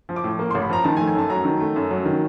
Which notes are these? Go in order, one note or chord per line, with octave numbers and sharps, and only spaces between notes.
F3
D6
A2
A#3
A1 C6
B5
F3 A#5
D#3 A5
G#5
A3
G#5
F#2 A5
F#3 A#5
D#3
A3
F#2
F#3
D#3